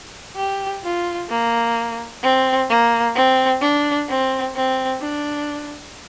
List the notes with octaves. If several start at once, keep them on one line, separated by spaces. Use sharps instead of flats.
G4
F4
A#3
C4
A#3
C4
D4
C4
C4
D4